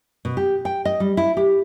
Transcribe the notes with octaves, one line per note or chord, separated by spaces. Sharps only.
B2
G4
G5
D#5
G3
E4
G4